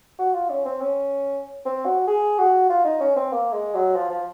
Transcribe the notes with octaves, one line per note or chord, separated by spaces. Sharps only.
F#4
F4
C#4
C4
C#4
C4
F#4
G#4
F#4
F4
D#4
C#4
C4
A#3
G#3
F#3
F3
F3